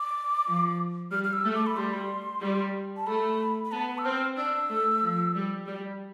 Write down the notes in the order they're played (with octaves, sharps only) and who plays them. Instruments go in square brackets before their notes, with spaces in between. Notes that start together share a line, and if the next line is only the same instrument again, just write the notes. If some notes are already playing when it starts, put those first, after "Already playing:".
Already playing: [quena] D6
[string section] F3
[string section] G3 [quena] F6
[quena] F6
E6
[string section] A3
[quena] D6
B5
[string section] G3 [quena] C6
[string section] G3
[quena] A5
[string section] A3 [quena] B5
[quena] B5
[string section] B3 [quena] A5
[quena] E6
[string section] C4 [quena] F6
[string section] D4 [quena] E6
[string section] A3
F3
G3
G3